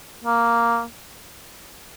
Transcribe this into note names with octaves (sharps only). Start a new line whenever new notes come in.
A#3